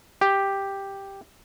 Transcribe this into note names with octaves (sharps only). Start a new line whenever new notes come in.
G4